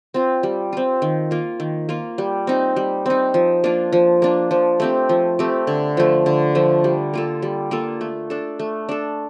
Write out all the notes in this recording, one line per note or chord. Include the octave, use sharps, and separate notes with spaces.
C4 F4
G3
C4 F4
D#3
A#3 F4
D#3
A#3 F4
G3
C4 D#4
G3
C4 D#4
F3
A#3 D4 F4
F3
A#3 D4 F4
F3
A3 C4 G4
F3
A3 C4 G4
D3
F3 A3
D3
F3 A3
G3
A#3 F4 A4
G3
A#3 F4 A4
A3
D4 A4
A3
D4 A4